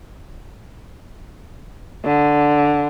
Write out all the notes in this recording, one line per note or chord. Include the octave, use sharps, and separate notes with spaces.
D3